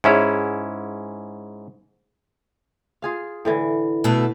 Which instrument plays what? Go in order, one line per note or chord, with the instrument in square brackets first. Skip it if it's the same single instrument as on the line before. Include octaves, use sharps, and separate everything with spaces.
[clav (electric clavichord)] G#2 C#4 E4 [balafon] G#4 C#5 E5
[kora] F4 G#4 F5
A2 D3 E3
[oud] B2 A3